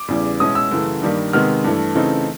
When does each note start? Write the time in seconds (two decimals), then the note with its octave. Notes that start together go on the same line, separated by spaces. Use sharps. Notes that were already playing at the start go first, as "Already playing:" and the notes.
Already playing: D6
0.08 E2 C#3 E3 G3
0.40 B2 G#3 C#4 E4 D#6
0.55 E6
0.71 F#2 C#3 E3 A3
1.02 G2 D#3 G3 A#3
1.33 C3 D#3 G#3 B3 F6
1.64 G2 E3 A3
1.95 C#3 E3 A3 C4 D#4